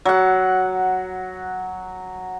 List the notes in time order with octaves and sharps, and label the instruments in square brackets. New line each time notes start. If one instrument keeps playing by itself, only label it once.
[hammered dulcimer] F#3 F#5